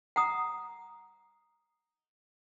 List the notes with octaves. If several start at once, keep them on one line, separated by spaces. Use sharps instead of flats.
F#5 A#5 D#6